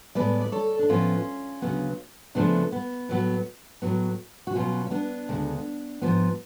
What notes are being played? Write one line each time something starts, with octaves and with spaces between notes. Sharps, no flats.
A2 G#3 B3 B4 D5
D5
A4 C#5
D4
A2 F3 B3 C#4 F4
D2 C#3 F#3 B3
D2 C#3 F3 A3 B3 D4
B3
A2 F#3 B3
A2 F#3 B3
F#4
B2 F#3 B3 C#4 F4
C#4
B3 D4
D2 C#3 G#3
G#2 F3 B3